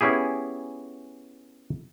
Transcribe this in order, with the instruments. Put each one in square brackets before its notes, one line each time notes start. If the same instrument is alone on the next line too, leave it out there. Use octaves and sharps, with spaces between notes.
[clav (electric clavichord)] B3 C#4 E4 G4 G#4